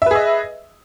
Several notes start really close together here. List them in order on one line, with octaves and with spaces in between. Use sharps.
E5 B4 G#4 D#5